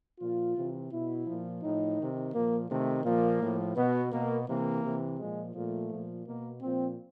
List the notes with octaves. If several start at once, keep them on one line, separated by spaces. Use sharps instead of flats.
A#2 F3 F4
C3 E3
B2 E4
A#2 F3
A2 F3 D#4
C3 D#3
A#2 F3 A#3
C3 D#3 A3
A#2 F3 A#3
A2 F3
B2 B3
B2 A#3
C3 E3 A#3
C3 E3
A#2 F3 G#3
A#2 F3 A3
A#2 F3
B2 A#3
A#2 F3 C4